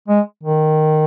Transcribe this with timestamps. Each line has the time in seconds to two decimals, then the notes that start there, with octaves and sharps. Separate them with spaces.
0.08 G#3
0.43 D#3